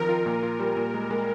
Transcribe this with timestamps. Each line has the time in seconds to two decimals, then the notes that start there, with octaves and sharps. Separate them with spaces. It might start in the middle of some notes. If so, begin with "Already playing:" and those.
Already playing: D#3 F3 C4 A#4
0.09 F4
0.26 A#2
0.43 F4
0.59 G3
0.77 A#2
0.94 G#3
1.11 G#3